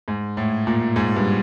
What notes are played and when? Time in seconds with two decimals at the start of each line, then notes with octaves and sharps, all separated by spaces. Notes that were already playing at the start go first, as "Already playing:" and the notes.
0.08 G#2
0.37 A2
0.67 A#2
0.96 G#2
1.16 G2